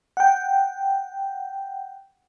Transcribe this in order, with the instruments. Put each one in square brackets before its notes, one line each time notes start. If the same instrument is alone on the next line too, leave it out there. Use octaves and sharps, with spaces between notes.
[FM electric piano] F#5 G5